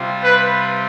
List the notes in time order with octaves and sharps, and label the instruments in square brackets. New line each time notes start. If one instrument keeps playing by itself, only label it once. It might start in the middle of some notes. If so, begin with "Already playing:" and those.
Already playing: [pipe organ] C3 G3 C4 F4
[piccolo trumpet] B4